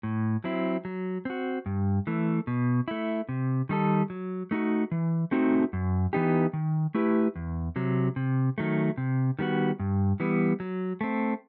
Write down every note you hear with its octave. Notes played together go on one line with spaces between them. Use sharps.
A2
F#3 C4 E4
F#3
C4 F#4
G2
E3 A3
B2
A3 E4
C3
D#3 G3 D#4 A4
F#3
A3 D#4 F#4
E3
A3 C4 D#4 F#4
F#2
E3 B3 D#4 G4
D#3
A3 E4 G4 B4
E2
C3 F#3
C3
D#3 F#3 A3
C3
D#3 G3 B3 F#4
G2
E3 G3 B3
F#3
A3 C4